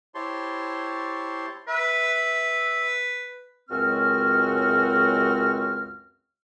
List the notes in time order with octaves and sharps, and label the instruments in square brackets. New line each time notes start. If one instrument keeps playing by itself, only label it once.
[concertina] E4 G4 C5 C#5 A5 C6
[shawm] B4 [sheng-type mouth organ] E5
[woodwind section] C#2 F#2 G#3 C4 F#4 F6